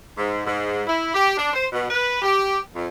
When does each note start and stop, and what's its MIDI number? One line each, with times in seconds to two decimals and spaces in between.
0.18 0.42 44
0.46 0.84 44
0.87 1.15 64
1.15 1.34 67
1.38 1.51 62
1.53 1.66 72
1.72 1.87 47
1.90 2.18 71
2.21 2.58 67
2.75 2.87 41